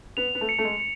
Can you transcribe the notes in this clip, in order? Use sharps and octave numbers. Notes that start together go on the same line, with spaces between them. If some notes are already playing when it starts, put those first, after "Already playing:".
B3 F7
B3
A3
C#7
A3
G#3
C#7